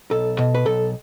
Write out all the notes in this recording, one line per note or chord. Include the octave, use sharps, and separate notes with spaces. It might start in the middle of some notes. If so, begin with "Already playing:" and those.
B1 A4
B2
B4
B1 A4